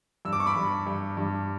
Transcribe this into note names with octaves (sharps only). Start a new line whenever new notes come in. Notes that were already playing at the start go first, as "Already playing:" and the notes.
G2 E6
D6
C#6
B5 D6
G2
G2
G2